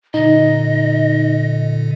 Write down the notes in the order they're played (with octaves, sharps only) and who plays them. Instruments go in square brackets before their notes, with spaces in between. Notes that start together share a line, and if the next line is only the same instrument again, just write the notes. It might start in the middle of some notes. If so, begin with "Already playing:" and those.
[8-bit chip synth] A#2 D3 [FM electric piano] D#4 [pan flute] D#5